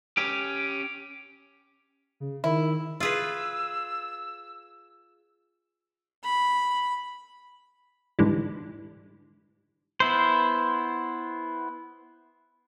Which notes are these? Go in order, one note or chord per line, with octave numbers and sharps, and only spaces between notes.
C#4 G4
C#3
D#3 E4
F4 G#4 B4 E6
B5
G#2 D3 E3 G3
B3 E4 C5